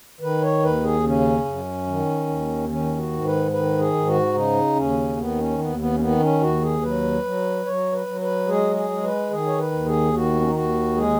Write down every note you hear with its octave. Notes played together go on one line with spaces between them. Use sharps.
D#3 B4
C#5
D#2 B4
G#4
C#3 C#4
F#2
D#3
D#2
D#3 C#4
F#4
G#2
B4
D#3 B4
G#4
G#2
F#4
C#3 D#4
D#2 C#4
D#3 B3
C#4
D#2 B3
B3
C#4
D#3 B3
C#4
D#2 F#4
G#4
F#3 B4
F#3
F#3 C#5
B4
F#3
B4
G#3 G#4
G#4
G#3
B4
D#3 G#4
C#5
B4
D#2
G#4
D#3 F#4
B3
C#4
D#4
D#2 F#4
G#3 G#4